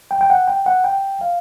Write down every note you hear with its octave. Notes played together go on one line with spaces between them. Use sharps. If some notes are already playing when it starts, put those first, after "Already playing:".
G5
G5
F#5
G5
F#5
G5
F5